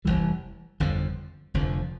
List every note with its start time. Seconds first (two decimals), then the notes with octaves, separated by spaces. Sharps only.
0.05 F1 E2 E3 G3
0.80 G1 F2 D3 F3
1.54 F1 F2 D3 F3